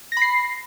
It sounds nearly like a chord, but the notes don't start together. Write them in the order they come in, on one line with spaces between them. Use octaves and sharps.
A#6 B5 C7